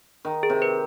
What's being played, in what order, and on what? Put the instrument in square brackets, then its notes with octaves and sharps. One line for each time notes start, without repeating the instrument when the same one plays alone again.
[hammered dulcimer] D#3
[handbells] G#4
[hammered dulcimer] C3
[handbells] B4